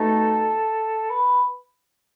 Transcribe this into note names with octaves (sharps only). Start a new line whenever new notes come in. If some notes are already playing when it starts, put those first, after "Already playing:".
Already playing: B2 A3 D#4 A4
B4